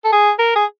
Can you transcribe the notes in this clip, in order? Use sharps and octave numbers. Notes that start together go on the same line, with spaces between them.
A4
G#4
A#4
G#4